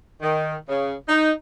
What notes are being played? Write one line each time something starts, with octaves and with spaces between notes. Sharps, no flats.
D#3
C#3
D#4